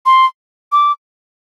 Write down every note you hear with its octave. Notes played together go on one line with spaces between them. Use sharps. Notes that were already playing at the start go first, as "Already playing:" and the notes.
C6
D6